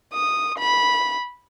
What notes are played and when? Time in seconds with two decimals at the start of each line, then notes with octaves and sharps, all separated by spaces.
0.14 D#6
0.58 B5